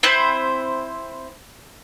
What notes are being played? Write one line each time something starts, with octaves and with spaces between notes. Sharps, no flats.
C4 E4 C5